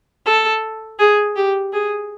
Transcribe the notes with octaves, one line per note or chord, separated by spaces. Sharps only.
A4
G#4
G4
G#4